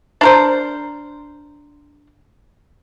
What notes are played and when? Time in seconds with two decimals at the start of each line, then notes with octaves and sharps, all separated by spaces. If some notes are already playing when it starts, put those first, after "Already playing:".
0.21 D4 A#4 C5